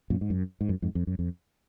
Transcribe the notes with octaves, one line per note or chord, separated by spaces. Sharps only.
F#2 A#2
G#2
F#2
G#2
F#2
F2 G#2
F2
F#2
F2